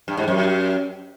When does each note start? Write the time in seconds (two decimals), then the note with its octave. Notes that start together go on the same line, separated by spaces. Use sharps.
0.08 G2
0.17 G#2
0.28 F#2